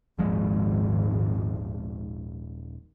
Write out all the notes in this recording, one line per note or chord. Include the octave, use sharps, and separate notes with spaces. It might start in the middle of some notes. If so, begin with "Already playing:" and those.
D#1 G#1 F3 G#3